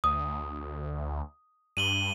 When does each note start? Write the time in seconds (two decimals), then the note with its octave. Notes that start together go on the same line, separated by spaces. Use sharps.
0.04 D2 D#6
1.77 G2 D#7 F#7 G7